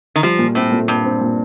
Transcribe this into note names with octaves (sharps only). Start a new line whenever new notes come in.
D#3
F3 G3
A#2
A2 C4
A#2
G2 A#2
C4
A#2